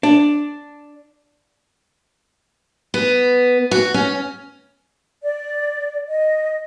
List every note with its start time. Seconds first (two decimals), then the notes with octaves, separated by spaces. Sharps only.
0.03 D4
2.94 B3
3.71 F#4
3.94 C#4
5.21 D5
6.08 D#5